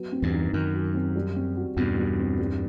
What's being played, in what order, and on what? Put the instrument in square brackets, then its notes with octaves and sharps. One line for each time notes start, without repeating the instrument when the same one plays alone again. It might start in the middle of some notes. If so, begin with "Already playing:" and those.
Already playing: [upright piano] F#3 B3
C4
[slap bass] E2 G2
[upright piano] D#4
[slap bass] F#2 [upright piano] D#3
[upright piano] F#3
C4
G3
C4
F#4
[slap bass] E2 G2 [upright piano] B2
[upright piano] G3
C4
G3